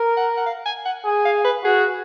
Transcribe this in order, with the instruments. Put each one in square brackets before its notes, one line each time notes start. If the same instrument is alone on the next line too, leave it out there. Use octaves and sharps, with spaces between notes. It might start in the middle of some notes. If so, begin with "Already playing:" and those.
Already playing: [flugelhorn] A#4
[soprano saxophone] F#5
F#5
F5
G#5
F#5
[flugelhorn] G#4
[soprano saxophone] F5
B4
[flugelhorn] F#4 [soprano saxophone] G#4